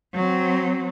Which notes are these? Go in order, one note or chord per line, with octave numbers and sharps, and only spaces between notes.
F#3 C4